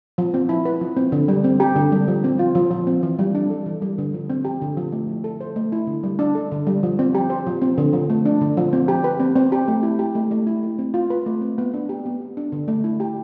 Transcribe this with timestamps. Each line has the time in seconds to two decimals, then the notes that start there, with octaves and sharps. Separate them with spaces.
0.18 F3
0.34 C4
0.49 E4
0.65 B4
0.81 F3
0.97 C4
1.12 D3
1.28 G3
1.44 C4
1.60 G4
1.76 D3
1.92 G3
2.08 F3
2.24 C4
2.39 F4
2.55 F3
2.71 F3
2.87 C4
3.03 E3
3.19 G3
3.35 D4
3.50 A4
3.66 E3
3.82 G3
3.98 D3
4.14 F3
4.30 C4
4.45 G4
4.62 D3
4.77 F3
4.92 A3
5.09 E4
5.24 A4
5.41 C5
5.56 A3
5.72 E4
5.87 D3
6.03 G3
6.19 D4
6.35 A4
6.52 D3
6.67 G3
6.83 F3
6.99 C4
7.15 G4
7.30 C5
7.47 F3
7.62 C4
7.78 D3
7.93 F3
8.10 A3
8.26 D4
8.41 D3
8.57 F3
8.73 C4
8.88 G4
9.04 B4
9.20 C4
9.36 C4
9.52 G4
9.68 A3
9.83 E4
9.99 G4
10.15 A3
10.31 A3
10.47 E4
10.63 A3
10.79 C4
10.94 F4
11.10 B4
11.26 A3
11.41 C4
11.58 B3
11.74 D4
11.89 G4
12.05 B3
12.21 B3
12.37 D4
12.52 D3
12.68 A3
12.84 E4
13.00 G4